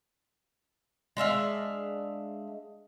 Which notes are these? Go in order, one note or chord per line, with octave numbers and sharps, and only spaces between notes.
G#3 D4 E5 F5